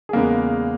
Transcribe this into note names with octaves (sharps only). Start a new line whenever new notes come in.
G#4
E2 C#3 G#3 A#3 B3 A#4